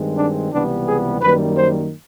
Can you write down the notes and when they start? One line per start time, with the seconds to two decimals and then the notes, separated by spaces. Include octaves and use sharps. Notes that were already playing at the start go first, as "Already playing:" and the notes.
Already playing: G2 D#3 G#3 C4
0.16 D4
0.51 C#2 C3 E3 G3 B3 D4
0.86 G#4
1.21 F#2 D#3 G3 A#3 B4
1.56 C5